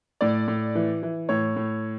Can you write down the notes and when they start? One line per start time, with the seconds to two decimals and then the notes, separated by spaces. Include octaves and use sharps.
0.21 A2 D5
0.48 A2
0.75 E3
1.03 E3
1.29 A2 C#5
1.56 A2